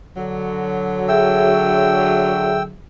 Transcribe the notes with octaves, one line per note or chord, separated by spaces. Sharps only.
D3 F#3
G#4 E5 G5 E6